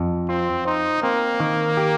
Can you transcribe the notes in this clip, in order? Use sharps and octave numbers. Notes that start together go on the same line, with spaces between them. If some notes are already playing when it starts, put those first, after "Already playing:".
Already playing: F2
C4 F4
D#4 C5
A#3 C4
D#3
G4